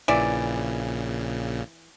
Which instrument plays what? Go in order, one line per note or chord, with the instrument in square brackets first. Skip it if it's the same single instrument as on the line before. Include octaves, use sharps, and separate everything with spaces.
[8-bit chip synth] A#1 A#2 C#3 [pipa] E3 D5